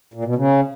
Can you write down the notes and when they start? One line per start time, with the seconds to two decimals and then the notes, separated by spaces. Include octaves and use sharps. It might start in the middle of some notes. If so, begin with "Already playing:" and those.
0.14 A#2
0.25 B2
0.35 C#3